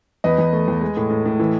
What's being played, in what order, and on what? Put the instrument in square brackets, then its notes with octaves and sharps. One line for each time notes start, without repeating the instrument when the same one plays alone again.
[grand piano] E2 B4 D#5
E2
A3
E2
G#3
A2
A2
A2
E3